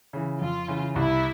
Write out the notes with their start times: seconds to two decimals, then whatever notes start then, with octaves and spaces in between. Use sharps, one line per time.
0.13 C#3 E3
0.41 F2 F4
0.68 C#3 E3
0.96 C2 E4